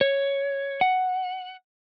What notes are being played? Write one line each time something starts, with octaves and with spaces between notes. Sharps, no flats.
C#5
F#5